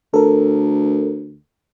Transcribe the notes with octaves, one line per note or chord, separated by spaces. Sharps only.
D2 A4 A#4